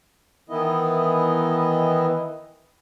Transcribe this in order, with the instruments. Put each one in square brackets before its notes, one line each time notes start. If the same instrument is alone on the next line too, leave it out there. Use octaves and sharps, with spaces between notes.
[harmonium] D#3 E3 B3 E4 D#5